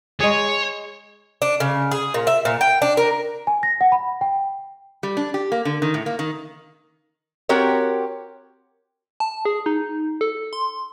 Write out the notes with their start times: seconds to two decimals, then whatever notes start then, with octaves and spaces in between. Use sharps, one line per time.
0.20 G#3 G#4 C#5
1.42 D4
1.60 C#3
1.91 G#4
2.14 A#2
2.27 E5
2.45 A#2
2.61 G5
2.82 D4
2.97 A#4
3.47 G#5
3.63 A#6
3.81 F#5
3.92 B5
4.21 G5
5.03 G3
5.17 D4
5.34 G4
5.52 A#3
5.65 D3
5.82 D#3
5.94 A2
6.06 A#3
6.19 D#3
7.49 C4 F#4 G4 A#4 C#5
9.20 A5
9.45 G#4
9.66 D#4
10.21 A4
10.53 C6